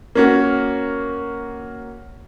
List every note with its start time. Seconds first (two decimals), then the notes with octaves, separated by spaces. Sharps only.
0.15 A#3 C#4 F#4